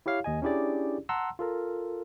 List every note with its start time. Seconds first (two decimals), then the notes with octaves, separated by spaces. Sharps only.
0.06 E4 G4 C#5 F5
0.24 D#2 D#5 G#5
0.42 C#4 D4 E4 G4 G#4 D5
1.09 F#5 A5 A#5 C6 E6
1.39 F4 A4 A#4